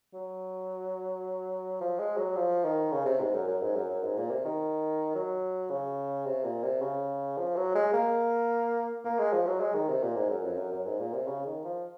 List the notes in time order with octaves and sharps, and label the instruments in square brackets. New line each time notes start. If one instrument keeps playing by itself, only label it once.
[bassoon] F#3
F3
G#3
F#3
F3
D#3
C#3
C3
G#2
F#2
F#2
G#2
F#2
F#2
G#2
A#2
C3
D#3
F#3
C#3
C3
A#2
C3
C#3
F3
F#3
G#3
A#3
A#3
G#3
F3
F#3
G#3
D#3
C3
A#2
G#2
F#2
F2
F#2
F#2
G#2
A#2
C3
C#3
D#3
F3